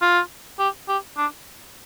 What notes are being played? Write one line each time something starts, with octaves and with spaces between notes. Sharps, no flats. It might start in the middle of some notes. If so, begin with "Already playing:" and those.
F4
G4
G4
D4